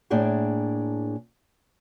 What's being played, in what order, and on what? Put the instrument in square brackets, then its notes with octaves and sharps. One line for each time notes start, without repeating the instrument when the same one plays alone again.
[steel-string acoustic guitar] A2 A#3 D4 G#4 A5